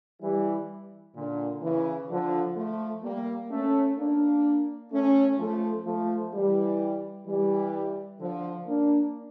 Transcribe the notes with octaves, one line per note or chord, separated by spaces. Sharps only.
E3 G3
A#2 D3
C#3 E3
D3 F3
F3 A3
G3 A#3
A3 C#4
A#3 D4
A3 C#4
F3 A3
F3 A3
E3 G3
E3 G3
D3 F3
A#3 D4